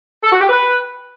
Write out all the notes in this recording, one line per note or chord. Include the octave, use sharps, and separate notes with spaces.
A4
F#4
G4
B4